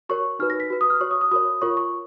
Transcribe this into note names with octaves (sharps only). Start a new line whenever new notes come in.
F#4 A#4 C#5 C#6
D#4 F#4 B4 F6
A#6
B6
F#4 B4
D#6
F6
F#4 C#5 C#6
D#6
D#6
F#4 A#4 C#5 D#6
F4 A#4 C#5 C#6
C#6